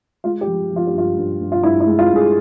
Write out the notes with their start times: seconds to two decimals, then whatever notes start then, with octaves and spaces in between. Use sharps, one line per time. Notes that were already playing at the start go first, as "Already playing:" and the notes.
0.24 G#3 F4
0.41 G4
0.47 F3
0.71 F3
0.76 F4
0.87 G4
0.93 G2 F4
1.17 G2
1.40 G2
1.52 F4
1.63 G2 E4
1.80 E4
1.87 G#3
1.99 F4
2.10 G2
2.16 G#4